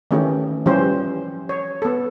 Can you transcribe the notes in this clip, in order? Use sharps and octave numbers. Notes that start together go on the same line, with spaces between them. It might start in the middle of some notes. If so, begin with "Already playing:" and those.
D#3 E3 A3 C#4 G4
E3 F3 G3 C#4 G4 C5
C#5
B3 A4